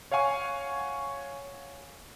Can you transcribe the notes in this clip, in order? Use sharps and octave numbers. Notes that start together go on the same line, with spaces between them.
C#5 F5 F#5 G#5 C#6